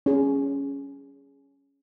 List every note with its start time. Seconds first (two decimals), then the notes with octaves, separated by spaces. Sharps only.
0.06 C#4 G#4